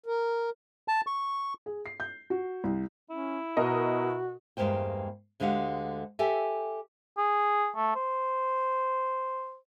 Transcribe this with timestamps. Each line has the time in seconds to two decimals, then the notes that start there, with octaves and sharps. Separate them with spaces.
0.06 A#4
0.88 A5
1.07 C#6
1.66 G#4
1.86 C7
2.00 G6
2.30 F#4
2.64 C2
3.10 C#4 E4
3.57 B2 F#4 A#4 D#5
4.57 E2 G2 G#3 A#3 C5 G5
5.40 D2 D3 G#3 G4 F5 F#5
6.19 G4 A4 E5 G5 G#5
7.18 G#4
7.76 A3
7.95 C5